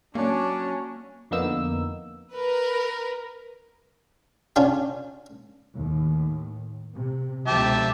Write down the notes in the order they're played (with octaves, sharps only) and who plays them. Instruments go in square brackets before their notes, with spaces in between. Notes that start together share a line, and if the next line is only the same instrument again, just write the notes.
[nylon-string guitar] F#3 [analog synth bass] A#3 [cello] C#4 [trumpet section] D4
[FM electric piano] F2 D3 A#3 B3 D#4 E6
[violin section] A#4 B4
[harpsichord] C#4 D4 F4 G4
[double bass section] D#2 A2 D#3
C3
[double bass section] C#2 B2 F3 [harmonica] G4 E5 A5